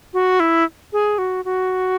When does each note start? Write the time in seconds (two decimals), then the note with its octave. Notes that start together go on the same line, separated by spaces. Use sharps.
0.13 F#4
0.40 E4
0.93 G#4
1.18 F#4
1.45 F#4